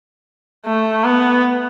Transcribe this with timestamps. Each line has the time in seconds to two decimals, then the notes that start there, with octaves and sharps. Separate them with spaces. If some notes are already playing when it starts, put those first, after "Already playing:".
0.65 A3
1.04 B3